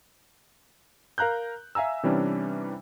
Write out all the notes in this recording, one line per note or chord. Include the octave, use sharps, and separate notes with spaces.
A#4 F5 A#5 F#6 G6
E5 F5 G#5 A#5 E6
C3 E3 G3 C#4 D4